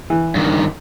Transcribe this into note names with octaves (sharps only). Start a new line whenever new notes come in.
E3
G2 D#3